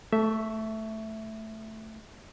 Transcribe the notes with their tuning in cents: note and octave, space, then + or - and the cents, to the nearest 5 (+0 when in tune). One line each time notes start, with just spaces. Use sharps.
A3 +0 E5 +0 C#6 +25